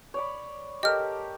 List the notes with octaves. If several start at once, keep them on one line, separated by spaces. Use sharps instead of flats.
C#5 D5 B5
G4 A4 A#4 D#5 F6